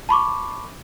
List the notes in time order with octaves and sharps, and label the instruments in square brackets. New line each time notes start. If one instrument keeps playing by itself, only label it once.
[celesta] A5 B5 C#6 D6